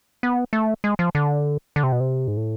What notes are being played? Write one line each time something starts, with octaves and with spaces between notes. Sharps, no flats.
B3
A3
G#3
F3
D3
D3
C3
B2
C3
G#2
A2